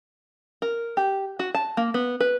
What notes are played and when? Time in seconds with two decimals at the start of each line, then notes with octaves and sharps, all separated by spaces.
0.62 A#4
0.97 G4
1.39 F#4
1.55 A5
1.77 A#3
1.94 B3
2.20 B4